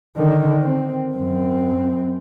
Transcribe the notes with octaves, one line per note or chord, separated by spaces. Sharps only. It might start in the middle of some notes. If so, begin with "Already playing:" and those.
D3 D#3
C4
F#2 C4